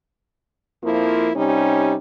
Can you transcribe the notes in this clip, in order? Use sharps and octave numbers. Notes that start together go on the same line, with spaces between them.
F2 F3 A#3 E4
C3 G3 C#4 D#4